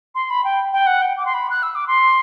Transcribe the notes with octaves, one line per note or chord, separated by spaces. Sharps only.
C6
B5
G5
G5
F#5
G5
D6
C6
B5
F#6
E6
D6
C6